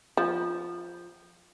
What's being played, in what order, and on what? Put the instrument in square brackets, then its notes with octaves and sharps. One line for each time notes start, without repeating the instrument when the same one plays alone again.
[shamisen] F3